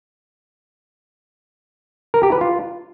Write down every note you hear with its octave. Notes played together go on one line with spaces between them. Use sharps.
A#4
G4
B4
F4